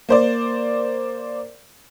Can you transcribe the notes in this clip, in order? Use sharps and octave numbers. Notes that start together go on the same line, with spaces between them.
A#3 C5 D5